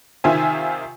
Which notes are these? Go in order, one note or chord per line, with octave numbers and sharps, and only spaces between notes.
C3 D#3 F4 C5 E5 G#5